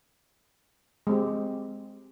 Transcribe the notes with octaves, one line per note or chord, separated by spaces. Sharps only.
G#3 C4 G4